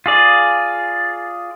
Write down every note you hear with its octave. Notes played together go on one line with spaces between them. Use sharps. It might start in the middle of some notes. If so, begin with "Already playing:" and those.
F4 G#4 D5